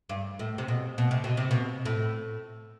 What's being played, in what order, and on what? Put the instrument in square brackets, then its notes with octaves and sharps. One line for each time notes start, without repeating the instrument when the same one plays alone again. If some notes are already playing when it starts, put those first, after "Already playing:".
[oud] G2
A2
C3
B2
B2
C3
B2
C3
B2
A2